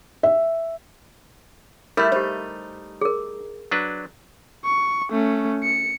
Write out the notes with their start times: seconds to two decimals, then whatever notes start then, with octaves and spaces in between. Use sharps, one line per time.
0.23 E5
1.97 G3 A3 E4 A#4
2.12 D#4 G4 C5
3.01 G#4 A#4
3.71 F#3 D4 B4
4.65 C#6
5.12 A3 C#4
5.63 C#7